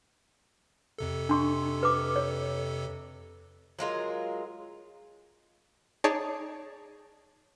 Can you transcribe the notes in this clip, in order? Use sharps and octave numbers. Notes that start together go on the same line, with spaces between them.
F2 C3 A4
D4 C6 C#6
B4 D6
C#5
F#3 G#3 F4 A#4
D#4 G#4 C#5 D5 A5